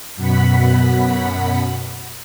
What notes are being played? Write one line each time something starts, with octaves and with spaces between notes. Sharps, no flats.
F#2 B2 F#5 B5 B6